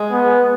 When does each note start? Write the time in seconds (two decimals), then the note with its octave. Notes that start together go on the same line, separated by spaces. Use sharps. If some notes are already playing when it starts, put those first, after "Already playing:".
Already playing: G#3
0.12 B3